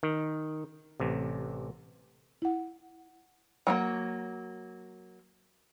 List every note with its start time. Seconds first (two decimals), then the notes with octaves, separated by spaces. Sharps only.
0.03 D#3
1.00 A1 C3
2.42 E4 F#5
3.67 F#3 A3 A#3